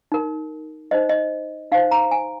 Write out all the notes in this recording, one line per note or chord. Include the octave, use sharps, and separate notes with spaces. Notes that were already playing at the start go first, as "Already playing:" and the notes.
D#4 A#4
D#4 C5 D#5
D#5
D#4 C5 F5
A#5
G#5